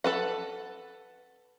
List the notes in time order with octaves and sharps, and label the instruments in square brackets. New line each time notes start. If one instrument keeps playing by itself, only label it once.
[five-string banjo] A4 B4 F#5